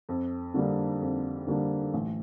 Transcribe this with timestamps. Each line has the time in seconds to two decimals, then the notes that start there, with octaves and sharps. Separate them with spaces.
0.09 F2
0.54 D3 G3 A#3 D4
1.01 F2
1.47 D3 G3 A#3 D4
1.94 A1